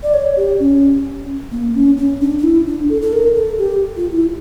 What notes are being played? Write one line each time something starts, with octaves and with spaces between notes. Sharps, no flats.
D5
C#5
G4
C#4
A#3
C#4
C#4
D4
D4
E4
D4
A4
A4
A#4
A4
G4
F4
E4